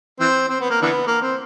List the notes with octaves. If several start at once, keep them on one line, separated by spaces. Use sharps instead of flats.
E3 C4
C4
B3
A#3
D3 E3 B3
A#3
C4